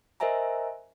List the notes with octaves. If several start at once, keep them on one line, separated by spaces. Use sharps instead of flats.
A#4 C5 D#5 E5 G#5 A#5